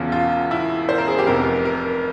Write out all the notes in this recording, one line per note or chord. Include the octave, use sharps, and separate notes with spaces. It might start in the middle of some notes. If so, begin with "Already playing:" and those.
Already playing: E1 E2 C#3 F4
F4
E4
C5
A#4
G#4
G4
F1 F2 C3 A#4
A#4